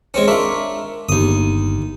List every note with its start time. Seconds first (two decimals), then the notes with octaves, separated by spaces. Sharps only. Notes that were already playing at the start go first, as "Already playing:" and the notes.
0.14 G#3 C4 C#4
0.28 D4 F4 A#4 E5 C#6
1.09 G1 D#2 D#6